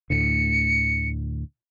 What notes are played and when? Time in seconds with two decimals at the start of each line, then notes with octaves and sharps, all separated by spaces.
0.10 D2 A2 D3 C#7